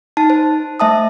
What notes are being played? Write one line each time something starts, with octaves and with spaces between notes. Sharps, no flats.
D#4 A5
C5
A3 E5 A5 D#6